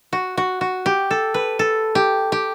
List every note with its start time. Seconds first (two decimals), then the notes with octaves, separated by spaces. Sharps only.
0.13 F#4
0.37 F#4
0.61 F#4
0.86 G4
1.11 A4
1.34 B4
1.59 A4
1.95 G4
2.32 G4